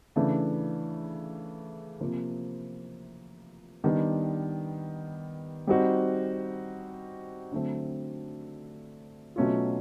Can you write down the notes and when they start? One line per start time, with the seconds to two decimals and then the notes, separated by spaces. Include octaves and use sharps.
0.16 C#3 E3 A3 D4
2.00 C3 F3 A#3
3.84 D#3 G3 B3 D4
5.67 G3 C4 D#4 F#4
7.52 D3 F#3 A3 C4
9.36 B2 F#3 A3 C#4 F4